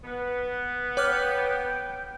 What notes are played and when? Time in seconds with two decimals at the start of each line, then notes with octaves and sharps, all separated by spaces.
0.04 B3
0.97 C#5 G5 D6 F6